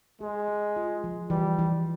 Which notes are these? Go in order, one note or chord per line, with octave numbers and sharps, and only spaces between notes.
G#3 G#4
G#4
F4
F3
E3 G3
E3